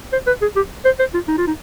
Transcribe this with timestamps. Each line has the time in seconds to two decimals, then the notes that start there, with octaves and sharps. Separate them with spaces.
0.13 C5
0.27 B4
0.42 G#4
0.56 G4
0.85 C5
0.99 C5
1.14 F4
1.28 D#4
1.38 F4
1.47 D#4